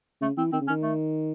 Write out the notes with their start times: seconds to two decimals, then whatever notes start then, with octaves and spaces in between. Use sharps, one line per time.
0.21 C#3 A3
0.37 E3 C4
0.53 D#3 C4
0.61 C#3
0.67 D#3 C#4
0.83 A3